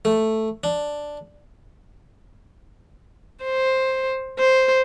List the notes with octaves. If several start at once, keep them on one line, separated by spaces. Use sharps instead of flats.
A3
D4
C5
C5